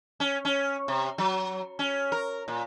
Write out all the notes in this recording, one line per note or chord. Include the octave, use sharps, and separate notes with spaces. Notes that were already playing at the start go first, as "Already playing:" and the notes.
C#4
C#4
C3
F#3
C#4
A#4
A#2